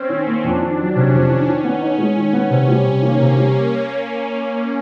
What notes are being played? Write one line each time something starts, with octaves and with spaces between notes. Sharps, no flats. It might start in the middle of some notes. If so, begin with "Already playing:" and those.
Already playing: C4 C#4
D#3
A#3
F2 D4
D#3
F#3
C3 C#4
F2
D#3
D#3
B3
D#4
G#3
D#3
B3
C3 C#4
G3
C3
D#3 A#3
C3
G3